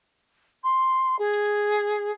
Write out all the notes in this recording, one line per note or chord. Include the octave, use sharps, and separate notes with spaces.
C6
G#4